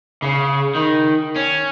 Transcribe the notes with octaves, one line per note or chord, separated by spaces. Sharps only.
C#3
D#3
C#4